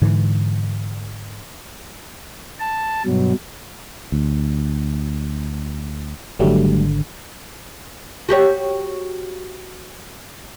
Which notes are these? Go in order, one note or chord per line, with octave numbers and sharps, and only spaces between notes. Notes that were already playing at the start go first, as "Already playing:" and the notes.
G#2 D3 E3
A5
G2 B2 F#3
D2
G#1 D3 F#3 G3 A3
F#4 G4 C#5